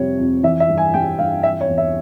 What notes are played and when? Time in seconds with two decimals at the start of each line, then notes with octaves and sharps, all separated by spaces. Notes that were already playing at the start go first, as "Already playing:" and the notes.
Already playing: F2 C3 G3 C#5
0.19 F2
0.43 E3 E5
0.60 E5
0.69 G2
0.78 G#5
0.94 G3 G5
1.19 G2 F5
1.43 E3 E5
1.61 C#5
1.69 E2
1.78 E5